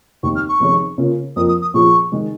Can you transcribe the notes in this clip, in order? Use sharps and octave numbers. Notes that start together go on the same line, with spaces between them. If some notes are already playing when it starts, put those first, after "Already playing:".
F1 D#2 D#3 C#6
F6
C#6
F1 F2 D#3 C#4 G#4
C#3 A#3 F4
F2 F3 A#3 D#6
D#6
D#6
A#2 F3 C#4 G#4 C#6
D#3 G#3